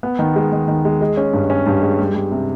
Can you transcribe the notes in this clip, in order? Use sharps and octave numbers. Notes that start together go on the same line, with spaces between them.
B3
D#3
G#3
D#3
D#3
G#3
G#3
C#4
G2
C#4
G2
G#3
G3
G3
C3